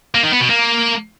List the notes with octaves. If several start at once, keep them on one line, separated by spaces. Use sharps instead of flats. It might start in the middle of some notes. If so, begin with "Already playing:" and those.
A#3
D#3
B3
B2
A#3